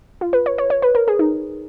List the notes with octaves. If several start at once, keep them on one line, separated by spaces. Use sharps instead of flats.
F4
B4
C#5
C#5
C#5
B4
A#4
G#4
D#4